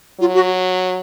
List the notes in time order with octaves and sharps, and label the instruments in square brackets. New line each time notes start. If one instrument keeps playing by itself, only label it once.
[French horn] F#3 [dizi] F4
[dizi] F#4